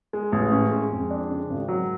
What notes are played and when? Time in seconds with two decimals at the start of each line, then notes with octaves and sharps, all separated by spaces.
0.13 G#3
0.32 A1
0.52 C#4
0.71 G#3
0.92 F2
1.11 D4
1.30 C#3
1.50 G#1
1.68 F#3